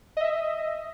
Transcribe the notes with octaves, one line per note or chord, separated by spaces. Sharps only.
D#5 E5